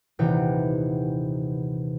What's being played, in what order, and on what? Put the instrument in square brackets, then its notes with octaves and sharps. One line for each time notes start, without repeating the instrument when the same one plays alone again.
[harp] D#1 C3 E3 D#4 B4 G5